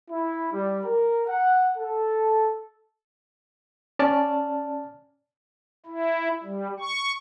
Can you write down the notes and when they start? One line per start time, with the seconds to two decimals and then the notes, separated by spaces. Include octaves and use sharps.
0.10 E4
0.53 G3
0.84 A#4
1.28 F#5
1.77 A4
3.99 C#4 D5 A5 F6
5.86 E4
6.43 G3
6.80 C#6